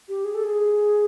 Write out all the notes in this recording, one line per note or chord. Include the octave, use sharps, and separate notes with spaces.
G4
G#4
A4
G#4